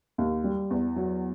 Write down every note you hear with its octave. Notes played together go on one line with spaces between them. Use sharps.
D#2
G3
E2
F#3